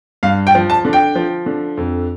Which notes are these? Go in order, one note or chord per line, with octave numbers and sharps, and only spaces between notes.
G2 F5
G5
F3
A5
D3
G5
F3
D3
F2